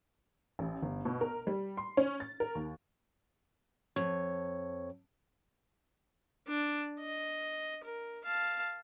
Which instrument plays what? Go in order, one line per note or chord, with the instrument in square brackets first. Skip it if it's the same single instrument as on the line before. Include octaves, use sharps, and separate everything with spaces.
[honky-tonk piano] A1
G1
B2
A#4
G3
C6
C#4
A6
A#4
D#2
[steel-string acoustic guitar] F2 [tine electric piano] C#5
[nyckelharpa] D4
D#5
A#4
F5 A5